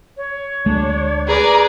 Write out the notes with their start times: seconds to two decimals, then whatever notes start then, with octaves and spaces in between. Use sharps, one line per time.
0.17 C#5
0.66 D2 G#3 A3 D4
1.28 C#4 G#4 A#4 B4 D5 A#5